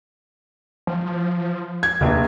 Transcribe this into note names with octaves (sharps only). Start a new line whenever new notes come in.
F3
G#6
F1 A#1 D#2